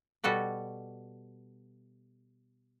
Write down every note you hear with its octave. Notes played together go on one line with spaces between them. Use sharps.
B2 G3 F#4 A4 B4